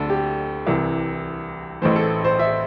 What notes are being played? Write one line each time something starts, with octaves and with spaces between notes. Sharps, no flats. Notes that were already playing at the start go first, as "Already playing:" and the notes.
Already playing: D2 D3 A4
G4
C2 C3 E3
A1 A2 E3 C5
A4
C5
E5